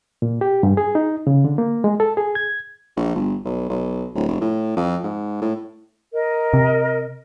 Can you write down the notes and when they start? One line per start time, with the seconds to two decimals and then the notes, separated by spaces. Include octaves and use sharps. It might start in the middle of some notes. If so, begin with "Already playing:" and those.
0.22 A#2
0.41 G4
0.63 G2
0.77 G#4
0.95 D#4
1.27 C#3
1.45 D3
1.58 A#3
1.84 G#3
2.00 A4
2.17 G#4
2.35 G#6
2.97 A#1
3.15 G1
3.45 B1
3.70 B1
4.15 D1
4.28 F1
4.41 A2
4.77 F2
5.04 G#2
5.42 A2
6.14 A#4 D#5
6.53 C3